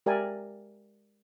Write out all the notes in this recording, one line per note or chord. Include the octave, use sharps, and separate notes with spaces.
G#3 G4 A#4 D5 E5 G#5